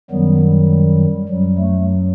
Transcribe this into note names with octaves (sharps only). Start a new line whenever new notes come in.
F#2 D#3 F#3 G3 B3
G3
F#2 F#3 G3
A3